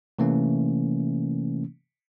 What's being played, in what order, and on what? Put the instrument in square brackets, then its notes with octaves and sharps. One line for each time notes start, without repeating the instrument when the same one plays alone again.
[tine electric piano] C3 E3 A3 A#3 C#4